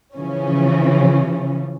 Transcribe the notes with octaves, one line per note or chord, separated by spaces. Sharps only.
C#3 E3 F3 C#4